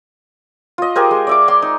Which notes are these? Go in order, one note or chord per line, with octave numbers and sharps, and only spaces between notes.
F4 D#5
G4 G#4 A#4 C5
G#3
D5 E5 D6
C6 D6
D#4